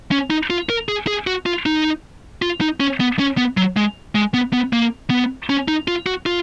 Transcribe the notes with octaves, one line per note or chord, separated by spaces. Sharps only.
C#4
D#4
F4
A#4
G#4
G#4
F#4
F4
D#4
F4
D#4
C#4
B3
C#4
B3
F#3
G#3
G#3
B3
B3
A#3
B3
C#4
D#4
F4
F#4
F4